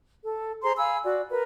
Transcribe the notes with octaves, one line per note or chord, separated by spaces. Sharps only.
A4
G#4 C5 A#5 C6
F5 G#5 B5 E6
F#4 D5
A#4 B4